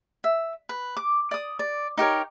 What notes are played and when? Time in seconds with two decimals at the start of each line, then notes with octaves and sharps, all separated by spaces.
0.24 E5
0.69 B4
0.97 D6
1.31 D5 D#6
1.59 D5
1.98 D#4 G4 A#4 C#5